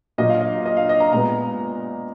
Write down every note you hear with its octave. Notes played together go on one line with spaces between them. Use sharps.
A#2 F#3 A#3 D#5
F5
D#5
D#5
F5
D#5
A#5
A#2 G#3 B3 A#5